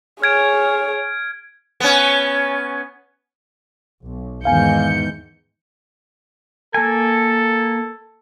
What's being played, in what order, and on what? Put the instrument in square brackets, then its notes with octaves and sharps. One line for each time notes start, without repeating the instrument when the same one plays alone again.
[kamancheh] G#4 C#5 [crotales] F6 G#6 D7
[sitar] B3 C#4
[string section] B1
[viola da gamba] E2 G#2 [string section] D#3 G6 C#7 [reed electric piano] F5 G#5
[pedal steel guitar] A#3 G#5 [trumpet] A4